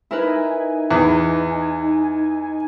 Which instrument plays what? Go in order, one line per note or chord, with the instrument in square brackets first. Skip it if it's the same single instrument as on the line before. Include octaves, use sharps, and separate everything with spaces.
[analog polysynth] D#4 G#5 [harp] E4 A#4 B4
[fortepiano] E2 [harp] B4